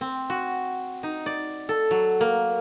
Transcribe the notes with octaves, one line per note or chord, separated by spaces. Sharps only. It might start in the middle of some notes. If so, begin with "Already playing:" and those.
C4
F#4
D#4
D5
A4
F#3
A#3